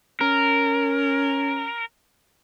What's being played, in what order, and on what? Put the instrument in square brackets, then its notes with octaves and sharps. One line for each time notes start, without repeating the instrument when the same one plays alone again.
[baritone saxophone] C#4 [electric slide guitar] A#4